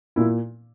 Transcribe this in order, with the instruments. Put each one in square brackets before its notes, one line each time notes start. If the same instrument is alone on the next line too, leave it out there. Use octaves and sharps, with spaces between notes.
[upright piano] A#2 E4